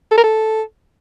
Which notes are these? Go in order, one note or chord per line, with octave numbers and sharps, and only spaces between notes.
A4
A#4
A4